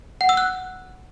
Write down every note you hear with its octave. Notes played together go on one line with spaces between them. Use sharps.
F#5
E6
F#6